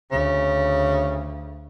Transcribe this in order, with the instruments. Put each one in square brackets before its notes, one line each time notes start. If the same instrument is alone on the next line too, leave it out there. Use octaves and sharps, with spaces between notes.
[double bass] D2 [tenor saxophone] C#3